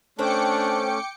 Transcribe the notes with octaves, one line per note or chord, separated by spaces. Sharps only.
D3 A3 C#4 D4 C5 G5 D6 C#7